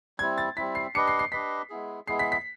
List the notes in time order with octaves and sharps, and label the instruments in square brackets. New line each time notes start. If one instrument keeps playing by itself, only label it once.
[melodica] G3 C4 E4 [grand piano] G#6
[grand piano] A6
[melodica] G3 C4 E4 [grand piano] B6
[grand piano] C7
[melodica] D4 G4 B4 D#5 [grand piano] C#7
[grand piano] C7
C7
[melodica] D4 G4 B4 D#5 [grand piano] B6
[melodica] G#3 B3 E4 G#4
[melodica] G#3 B3 E4 G#4 [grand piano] C7
[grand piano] B6
B6